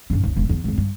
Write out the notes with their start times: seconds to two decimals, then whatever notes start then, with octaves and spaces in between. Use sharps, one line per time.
0.10 G2 C#4
0.23 F1 C#2
0.36 E1 F2
0.49 F#1 E2
0.64 G#1 E2
0.78 G2